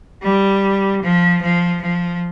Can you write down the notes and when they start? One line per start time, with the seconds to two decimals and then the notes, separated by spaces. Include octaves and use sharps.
0.23 G3
1.02 F3
1.42 F3
1.82 F3